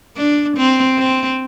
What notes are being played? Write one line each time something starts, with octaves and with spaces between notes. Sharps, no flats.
D4
C4
C4